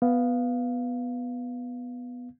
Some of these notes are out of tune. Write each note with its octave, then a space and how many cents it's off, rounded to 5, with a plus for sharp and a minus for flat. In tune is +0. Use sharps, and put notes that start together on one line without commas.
B3 +0 F5 +0